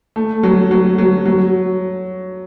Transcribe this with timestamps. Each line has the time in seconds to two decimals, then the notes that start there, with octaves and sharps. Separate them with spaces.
0.16 A3
0.43 F#3
0.71 F#3
0.98 F#3
1.25 F#3